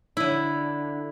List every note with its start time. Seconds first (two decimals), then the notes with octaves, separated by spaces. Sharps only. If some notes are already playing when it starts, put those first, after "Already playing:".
0.17 D3 E4